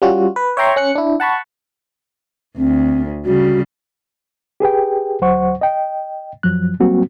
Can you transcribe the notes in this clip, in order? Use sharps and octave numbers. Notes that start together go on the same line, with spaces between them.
G3 C#4 F4 F#4
B4
C#5 E5 G5 A#5 C6 C#6
C#4 F#6 C#7
D4 E4
F#5 A5 B5 C#6
D2 C4
C#3 G3 F#4
G4 G#4 B4 G5
D2 F#3 C5 F#5 C#6
D#5 G5
F#2 F3 F#3 F#6
F#3 G3 A#3 C4 F#4